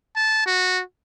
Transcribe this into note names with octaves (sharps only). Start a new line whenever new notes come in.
A5
F#4